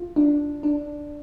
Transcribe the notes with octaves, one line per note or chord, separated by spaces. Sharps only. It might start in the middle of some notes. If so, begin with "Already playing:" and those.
Already playing: F4
D4
D4